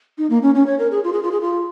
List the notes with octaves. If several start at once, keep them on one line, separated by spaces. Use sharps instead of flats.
D#4
A#3
C#4
C#4
C#5
A#4
G#4
F4
G#4
F4
G#4
F4